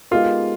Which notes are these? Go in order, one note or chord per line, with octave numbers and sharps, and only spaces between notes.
G#3 B3 D#4 F4 G4 A#4